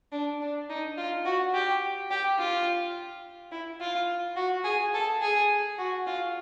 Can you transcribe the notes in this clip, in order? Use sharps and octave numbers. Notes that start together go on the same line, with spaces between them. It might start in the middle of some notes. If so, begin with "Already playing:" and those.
D4
D4
D#4
F4
F#4
G4
G4
F4
E4
F4
F#4
G#4
A4
G#4
F#4
F4